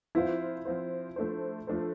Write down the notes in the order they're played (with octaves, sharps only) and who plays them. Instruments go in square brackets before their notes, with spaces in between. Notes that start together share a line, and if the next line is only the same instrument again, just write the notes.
[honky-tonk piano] F3 C4 F4 C5 [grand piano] E4
[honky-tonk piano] F3 C4 F4 C5
F3 A3 D4 A4 C5
F3 A3 D4 A4 C5